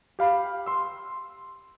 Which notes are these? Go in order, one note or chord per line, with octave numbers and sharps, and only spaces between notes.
G4 F5 B5
C6 E6